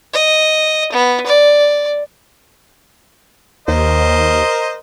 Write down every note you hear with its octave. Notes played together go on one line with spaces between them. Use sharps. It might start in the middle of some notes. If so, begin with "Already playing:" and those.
D#5
B3
D5
D#2 A#4 C5 D#5